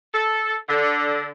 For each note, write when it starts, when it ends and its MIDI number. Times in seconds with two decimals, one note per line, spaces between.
0.14 0.56 69
0.69 1.28 50